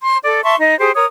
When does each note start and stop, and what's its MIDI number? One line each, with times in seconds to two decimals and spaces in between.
0.02 0.18 84
0.24 0.40 69
0.24 0.40 74
0.44 0.55 76
0.44 0.55 81
0.44 0.55 84
0.44 0.55 85
0.59 0.76 63
0.59 0.76 75
0.79 0.91 67
0.79 0.91 68
0.79 0.91 72
0.95 1.05 70
0.95 1.05 73
0.95 1.05 87